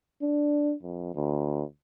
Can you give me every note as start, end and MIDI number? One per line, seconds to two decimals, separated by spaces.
0.22 0.74 62
0.83 1.11 41
1.15 1.63 38